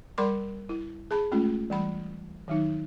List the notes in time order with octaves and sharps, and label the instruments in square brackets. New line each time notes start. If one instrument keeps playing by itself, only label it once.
[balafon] G3 A#4 D5 B5 C6 D6
E4
G#4 A5 B5
G#3 A3 C#4 F4
E3 G3 B5
D#3 F#3 D#4